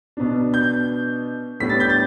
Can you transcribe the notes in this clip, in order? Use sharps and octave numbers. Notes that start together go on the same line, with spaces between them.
B2 B3 D4
G6
A2 G3 B3 D4 B6
A6
G6
A6